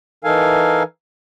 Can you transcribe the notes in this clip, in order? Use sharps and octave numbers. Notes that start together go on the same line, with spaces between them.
E3 D#4 A4 A#4 F5 G#5